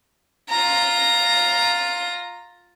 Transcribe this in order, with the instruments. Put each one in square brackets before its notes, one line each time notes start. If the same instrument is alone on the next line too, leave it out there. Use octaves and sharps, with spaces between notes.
[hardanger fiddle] F4 A#5